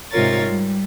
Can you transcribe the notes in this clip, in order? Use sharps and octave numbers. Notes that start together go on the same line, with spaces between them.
G#2 C3 F4 A#4 C#5 A6
G3